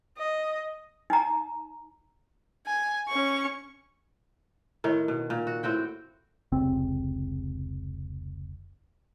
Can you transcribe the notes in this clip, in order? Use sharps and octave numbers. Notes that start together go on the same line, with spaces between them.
D#5
D#4 A#5
G#5
C#4 C#6
A2 D#3 C#5
B2
A#2
F#4
A2 C4 F#4 G5
F1 C#2 C4